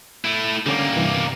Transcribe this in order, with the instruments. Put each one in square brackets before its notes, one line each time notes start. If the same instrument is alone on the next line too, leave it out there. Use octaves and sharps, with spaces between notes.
[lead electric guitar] A3 E4
[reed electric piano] D3 C#4 D6 [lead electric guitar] G3 A#3
[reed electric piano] G2 C3 E3